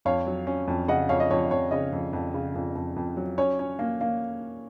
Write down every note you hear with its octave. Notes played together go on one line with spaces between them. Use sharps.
F2 C#5 F5
F#3
C#4
F2
C#3 D#5 F#5
F2 C#5 F5
D#5
F2 C#5
F2 C#5
C#3 D#5
F2
F2
C#3
F2
F2
F2
F#3
C#4 C#5
C#4
A#3
A#3